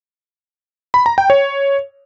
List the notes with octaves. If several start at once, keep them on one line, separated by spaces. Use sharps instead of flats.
B5
A#5
G5
C#5